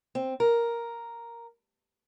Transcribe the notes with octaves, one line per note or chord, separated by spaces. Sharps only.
C4
A#4